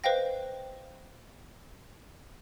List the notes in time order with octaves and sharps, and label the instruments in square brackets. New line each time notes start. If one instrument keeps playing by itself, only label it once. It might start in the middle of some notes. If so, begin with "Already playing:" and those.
[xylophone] B4 C5 D#5 F5 G5 A#6